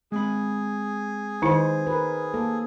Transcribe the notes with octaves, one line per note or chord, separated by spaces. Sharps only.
G#3 C4 G#4 B5
D#3 D#4 E4 B4 C5
A#4 B4
A#3 A4